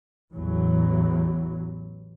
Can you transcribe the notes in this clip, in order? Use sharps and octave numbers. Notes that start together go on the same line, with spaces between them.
A1 E2 E3 F#3